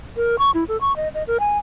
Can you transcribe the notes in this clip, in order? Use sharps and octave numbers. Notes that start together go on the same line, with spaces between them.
A#4
C#6
E4
A4
C#6
D#5
D#5
A#4
G#5